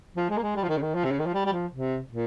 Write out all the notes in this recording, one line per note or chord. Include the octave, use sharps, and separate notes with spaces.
F3
G#3
A#3
G#3
G3
F3
D#3
C#3
D#3
F3
C3
C#3
D#3
F3
G3
G3
F3
C3
A#2